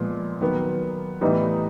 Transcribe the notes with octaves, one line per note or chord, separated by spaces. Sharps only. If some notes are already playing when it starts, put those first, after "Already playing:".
Already playing: A#2 F3 G#3 B3
D#3 F#3 B3
A2 E3 G3 B3 D#4